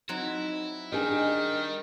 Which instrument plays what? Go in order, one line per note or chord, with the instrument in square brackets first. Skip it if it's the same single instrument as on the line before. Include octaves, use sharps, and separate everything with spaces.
[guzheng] F#3 C4 D#4 [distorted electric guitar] E4
[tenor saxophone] D#3 [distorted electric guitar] G3 [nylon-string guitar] D4 G#4 D#5